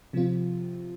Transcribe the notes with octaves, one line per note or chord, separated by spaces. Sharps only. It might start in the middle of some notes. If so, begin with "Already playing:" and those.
C3 F3 C4 F4